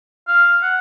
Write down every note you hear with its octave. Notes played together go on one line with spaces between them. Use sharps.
F5
F#5